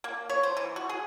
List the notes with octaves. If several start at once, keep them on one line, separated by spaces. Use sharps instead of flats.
A#3
C#5
C5
E3
F#4
G#4